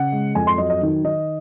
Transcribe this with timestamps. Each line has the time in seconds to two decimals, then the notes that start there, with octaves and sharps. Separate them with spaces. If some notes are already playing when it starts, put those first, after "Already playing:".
Already playing: C#3 F#5
0.12 G#3
0.35 F2 G#5
0.47 C6
0.58 F#3 D#5
0.70 D#5
0.82 D#3
1.04 D#3 D#5